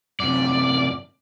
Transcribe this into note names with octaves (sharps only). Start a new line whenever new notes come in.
F#2 C3 D5